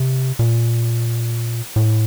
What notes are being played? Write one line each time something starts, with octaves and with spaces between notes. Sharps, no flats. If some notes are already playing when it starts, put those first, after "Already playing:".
Already playing: C3
A#2
A2